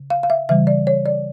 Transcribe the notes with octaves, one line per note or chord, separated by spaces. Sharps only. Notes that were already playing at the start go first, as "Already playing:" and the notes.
Already playing: C#3
F5
F5
E5
C#3 E3 G3 E5
D5
C#5
D5